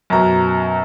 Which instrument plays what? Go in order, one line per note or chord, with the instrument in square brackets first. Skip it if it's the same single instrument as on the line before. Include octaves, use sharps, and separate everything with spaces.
[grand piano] F#2 B2 A#5